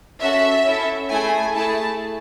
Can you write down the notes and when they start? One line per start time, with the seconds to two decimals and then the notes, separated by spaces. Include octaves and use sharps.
0.21 C#4 F#4 A4 E5
0.65 C#4 E4 A4
1.10 A3 E4 G#4 G#5
1.54 A3 E4 G#4 A5